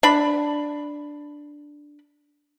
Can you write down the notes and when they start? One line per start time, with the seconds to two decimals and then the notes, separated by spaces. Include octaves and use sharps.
0.03 D4 B5